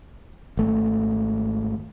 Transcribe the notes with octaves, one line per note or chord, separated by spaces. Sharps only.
G#1 A3